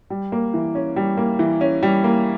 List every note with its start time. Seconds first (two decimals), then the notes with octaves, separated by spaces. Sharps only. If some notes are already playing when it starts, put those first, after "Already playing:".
0.10 G3
0.32 A#3
0.54 E3
0.75 C#4
0.96 G3
1.17 A#3
1.39 E3
1.61 C#4
1.83 G3
2.04 A#3